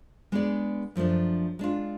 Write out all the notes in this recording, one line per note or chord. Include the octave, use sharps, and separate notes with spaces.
G#3 B3 D4 G#4 D5
F#2 F3 A3 D4
G#3 D4 F4